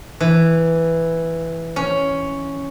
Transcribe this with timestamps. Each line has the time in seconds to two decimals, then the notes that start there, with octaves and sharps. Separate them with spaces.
0.21 E3
1.76 C#4